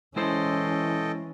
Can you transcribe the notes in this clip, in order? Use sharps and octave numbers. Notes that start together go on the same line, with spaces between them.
E3 G#3 C#4 E4 A4 C5 D#5 G5